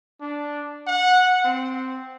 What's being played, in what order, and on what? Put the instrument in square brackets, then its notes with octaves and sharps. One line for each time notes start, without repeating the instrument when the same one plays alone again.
[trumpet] D4
F#5
C4